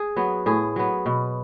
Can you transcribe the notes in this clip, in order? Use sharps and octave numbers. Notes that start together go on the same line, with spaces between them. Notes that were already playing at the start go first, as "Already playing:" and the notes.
Already playing: G#4
F#3 B3
A2 G#4
F#3 B3
B2